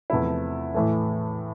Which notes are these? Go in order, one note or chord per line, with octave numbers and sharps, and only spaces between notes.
E2 C3 F3 A3 E4
A2 E3 A3